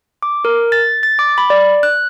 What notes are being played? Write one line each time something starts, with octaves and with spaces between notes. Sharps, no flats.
D6
A#4
A6
A6
D6
B5
D5
F#6